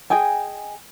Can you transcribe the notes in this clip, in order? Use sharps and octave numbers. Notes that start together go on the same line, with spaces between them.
G#4 D#5 G5 G#5